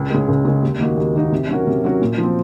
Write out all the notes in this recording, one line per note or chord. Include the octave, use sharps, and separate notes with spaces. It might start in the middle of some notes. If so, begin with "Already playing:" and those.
Already playing: C#2
C#3 G#3
C#2
C#3 G#3
D#2
D#3 A#3 D#4 F#4
D#2
D#3 A#3 D#4 F#4
C3
F#3 C#4 F#4 A#4
C3
F#3 C#4 F#4 A#4
A#2
F3 C4